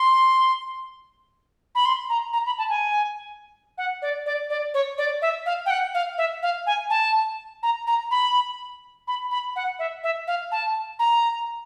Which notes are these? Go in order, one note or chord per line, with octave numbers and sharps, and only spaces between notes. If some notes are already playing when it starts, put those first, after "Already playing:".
Already playing: C6
B5
C6
A#5
A#5
B5
A5
G#5
F#5
D5
D5
D5
C#5
D5
E5
F5
G5
F#5
F5
E5
F5
G#5
A5
A#5
A#5
B5
B5
B5
F#5
E5
E5
F5
A5
A#5